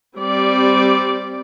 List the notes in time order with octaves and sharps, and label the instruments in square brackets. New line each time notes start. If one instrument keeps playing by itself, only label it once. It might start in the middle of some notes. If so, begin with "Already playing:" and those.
[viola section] G3 C4 D5